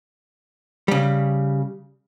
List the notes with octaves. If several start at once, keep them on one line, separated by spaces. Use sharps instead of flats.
C#3 G3